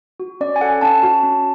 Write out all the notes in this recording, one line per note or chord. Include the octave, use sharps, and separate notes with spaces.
F#4
C#4 D5
G#5
A4 F#5
C#4 A5
F#4
C#4